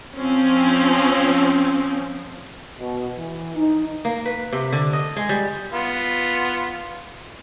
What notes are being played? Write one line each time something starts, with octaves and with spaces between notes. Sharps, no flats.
F3 C4 C#4
B2
E3
D#4
A#3
B4
C3
D3
D#5
G#3
G3
B3 F4